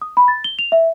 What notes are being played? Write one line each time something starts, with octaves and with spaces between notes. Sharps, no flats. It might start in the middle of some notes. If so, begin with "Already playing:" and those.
D#6
B5
A6
G7
F7
E5